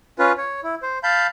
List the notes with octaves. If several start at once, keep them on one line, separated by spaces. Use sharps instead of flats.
C#4 F4 B4
C#5
E4
C5
F5 A5 B5 G6